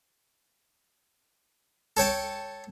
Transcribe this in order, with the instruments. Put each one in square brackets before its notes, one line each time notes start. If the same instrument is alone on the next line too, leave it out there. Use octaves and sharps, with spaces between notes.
[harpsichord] A4 C#5 G5 A5